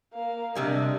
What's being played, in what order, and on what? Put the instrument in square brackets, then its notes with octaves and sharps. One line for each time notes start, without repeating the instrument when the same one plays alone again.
[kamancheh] A#3 F5
[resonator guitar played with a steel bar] C3 G3 G#3 [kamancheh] D4 D#5